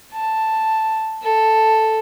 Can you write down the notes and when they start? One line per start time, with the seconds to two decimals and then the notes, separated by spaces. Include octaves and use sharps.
0.13 A5
1.22 A4